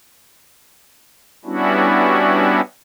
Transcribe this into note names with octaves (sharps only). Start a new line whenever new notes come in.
G3 B3 C#4 D4 E4 F#4